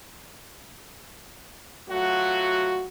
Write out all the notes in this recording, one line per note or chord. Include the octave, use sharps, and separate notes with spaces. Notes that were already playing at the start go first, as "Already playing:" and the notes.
F#3 A3 F4 F#4